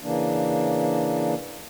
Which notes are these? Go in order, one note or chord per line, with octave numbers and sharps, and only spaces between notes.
C#3 E3 A#3 D4